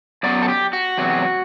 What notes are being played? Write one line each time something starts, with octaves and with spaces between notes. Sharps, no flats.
F#2 F#3 B3 D5
A4
G4
F#4
E2 C3 F#3